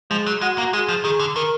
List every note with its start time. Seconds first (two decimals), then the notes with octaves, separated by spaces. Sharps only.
0.10 F3 G#3
0.26 F#3
0.41 G#3 F#4
0.58 A#3
0.62 F#4
0.73 G#3 G#4
0.89 F3
1.04 D#3 G#4
1.19 D3
1.36 D#3 A#4